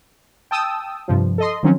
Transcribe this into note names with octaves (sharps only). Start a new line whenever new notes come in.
G5 A5 D#6 E6
G2 C3 F3
A4 D#5 C6
D#3 F3 F#3 C4 C#4